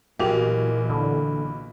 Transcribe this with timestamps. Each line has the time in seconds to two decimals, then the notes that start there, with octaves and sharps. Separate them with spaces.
0.20 B1 A#2 E3 G4 G#4 A#4 F7
0.90 D3 B5